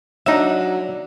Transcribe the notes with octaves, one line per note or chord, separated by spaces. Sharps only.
F#3 D4 D#4 E5